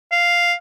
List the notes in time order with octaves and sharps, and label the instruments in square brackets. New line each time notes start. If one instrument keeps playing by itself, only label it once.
[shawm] F5